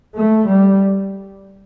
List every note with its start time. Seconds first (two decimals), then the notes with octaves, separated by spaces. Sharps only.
0.17 A3
0.49 G3